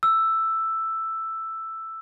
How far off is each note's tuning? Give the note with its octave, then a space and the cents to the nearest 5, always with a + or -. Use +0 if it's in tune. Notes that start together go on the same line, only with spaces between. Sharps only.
E6 +5